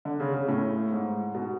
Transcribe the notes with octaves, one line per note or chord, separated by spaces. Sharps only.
D3
C#3
C#3
A2
G#2
B2